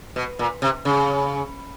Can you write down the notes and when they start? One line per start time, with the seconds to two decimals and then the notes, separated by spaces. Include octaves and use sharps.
0.16 B2
0.39 A#2
0.62 C3
0.85 C#3